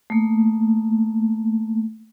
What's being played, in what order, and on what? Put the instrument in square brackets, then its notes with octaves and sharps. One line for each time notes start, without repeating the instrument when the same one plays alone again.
[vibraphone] A3 A#3